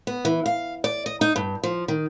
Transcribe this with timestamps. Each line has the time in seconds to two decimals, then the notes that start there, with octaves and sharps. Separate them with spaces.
0.07 B3
0.25 E3
0.46 F5
0.84 D5
1.06 D#5
1.21 D#4
1.36 G2
1.63 F3
1.88 D#3